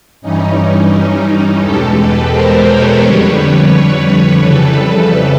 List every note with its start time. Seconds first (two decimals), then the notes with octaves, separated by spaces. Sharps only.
0.21 G2 E3 G3 C#4 D#4
1.61 E2 B2 G#3 G4 A4
1.96 A4 B4
2.31 A#4 C5
2.66 B4 C#5
3.01 F2 D3 G3
4.40 F2 C#3 E3 G3 A4 B4